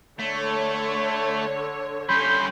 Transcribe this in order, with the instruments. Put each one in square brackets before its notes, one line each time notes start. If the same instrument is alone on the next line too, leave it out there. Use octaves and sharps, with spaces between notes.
[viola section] D3 C#5 [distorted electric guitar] A3
[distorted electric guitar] G3 C#4 [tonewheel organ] B5 C6 G6